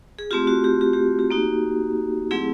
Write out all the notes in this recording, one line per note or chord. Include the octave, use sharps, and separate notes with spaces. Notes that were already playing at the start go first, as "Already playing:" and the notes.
G#4
A3 C4 F4 G4
F#4
G4
G4
G4
G4
A#3 D#4 F#4
F#3 A3 C4 E4 G#4